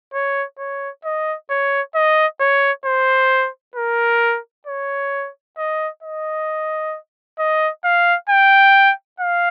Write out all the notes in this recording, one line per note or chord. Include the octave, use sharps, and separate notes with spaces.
C#5
C#5
D#5
C#5
D#5
C#5
C5
A#4
C#5
D#5
D#5
D#5
F5
G5
F5